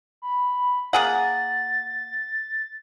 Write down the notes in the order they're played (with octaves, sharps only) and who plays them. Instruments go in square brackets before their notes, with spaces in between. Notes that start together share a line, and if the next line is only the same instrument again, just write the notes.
[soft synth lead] B5
[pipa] A#3 G#4 F#5 [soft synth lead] A6